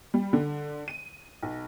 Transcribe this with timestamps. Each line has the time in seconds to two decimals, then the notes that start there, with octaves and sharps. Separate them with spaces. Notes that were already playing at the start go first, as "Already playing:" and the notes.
0.14 G3
0.33 D3
0.88 D#7
1.43 B1